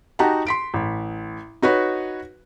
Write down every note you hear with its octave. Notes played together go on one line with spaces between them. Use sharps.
D#4 F#4 G4 F#5 A5 A#5
C6 B6 D7
A1
D#4 F#4 B4 C#5